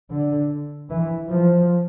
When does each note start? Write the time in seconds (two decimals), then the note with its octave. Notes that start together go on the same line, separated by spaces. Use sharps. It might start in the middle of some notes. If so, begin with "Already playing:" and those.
0.12 D3
0.90 E3
1.28 F3